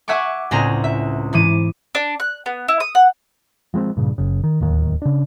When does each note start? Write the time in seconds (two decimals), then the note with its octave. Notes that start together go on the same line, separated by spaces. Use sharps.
0.08 E5 F#5 G#5 C#6 D6
0.51 C#2 A2 C4 D4 G#4 A#5
0.84 E5
1.33 G#2 E3 D6 D#7
1.95 D4
2.20 F#6
2.46 B3
2.68 E4
2.80 D#6
2.95 F#5
3.74 F3 G#3 B3 C4
3.97 G2 A#2 C#3
4.18 F#1 C#3
4.44 D#3
4.61 D1 D#2 D#3
5.02 C#3 D4